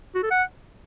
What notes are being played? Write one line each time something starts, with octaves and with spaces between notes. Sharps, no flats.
F#4
A4
F#5